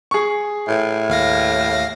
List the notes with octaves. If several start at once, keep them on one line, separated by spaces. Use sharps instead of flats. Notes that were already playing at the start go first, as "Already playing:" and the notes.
G#4 C#6
A2
D#2 F5 A#6